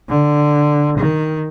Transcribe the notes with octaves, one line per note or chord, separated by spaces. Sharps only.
D3
D#3